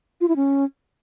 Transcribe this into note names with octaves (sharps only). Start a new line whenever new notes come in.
F4
E4
C#4